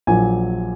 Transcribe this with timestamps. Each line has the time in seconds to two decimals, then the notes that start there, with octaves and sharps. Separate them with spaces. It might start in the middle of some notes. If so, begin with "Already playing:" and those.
0.07 A#1 A#2 F#3 G#5